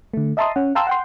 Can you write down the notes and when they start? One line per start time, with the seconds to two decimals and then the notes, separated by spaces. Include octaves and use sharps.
0.14 D3 A3
0.37 D#5 E5 A5 A#5 C6 D#6
0.56 C#4 F#5
0.75 F5 G5 A5 A#5 C6 E6
0.87 F#5 G5 C6